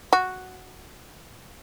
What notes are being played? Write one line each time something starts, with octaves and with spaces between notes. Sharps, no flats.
F#4